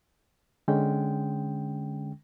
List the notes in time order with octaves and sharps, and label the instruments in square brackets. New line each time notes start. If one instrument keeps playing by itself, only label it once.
[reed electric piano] D3 G#3 C#4 G5